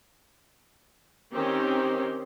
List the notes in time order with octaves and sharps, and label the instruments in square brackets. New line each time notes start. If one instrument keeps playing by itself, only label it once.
[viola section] D#3 C4 C#4 G4